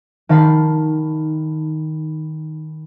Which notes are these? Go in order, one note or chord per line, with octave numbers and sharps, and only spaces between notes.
D#3 F5 A5 B5 C7